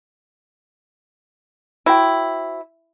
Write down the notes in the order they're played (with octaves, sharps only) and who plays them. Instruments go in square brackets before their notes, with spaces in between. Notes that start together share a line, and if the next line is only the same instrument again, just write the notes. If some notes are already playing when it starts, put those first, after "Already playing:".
[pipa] E4 [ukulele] F#4 C5 G5